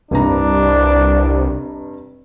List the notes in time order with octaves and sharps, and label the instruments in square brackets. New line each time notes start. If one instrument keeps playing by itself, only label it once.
[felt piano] F1 G2 A#5 [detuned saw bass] C2 [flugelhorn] D4